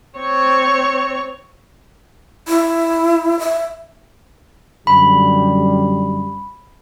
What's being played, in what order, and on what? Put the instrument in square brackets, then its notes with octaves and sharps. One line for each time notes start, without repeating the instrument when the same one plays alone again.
[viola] C4 C#5
[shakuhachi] E4
E5
[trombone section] F#2 D3 G3 [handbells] B5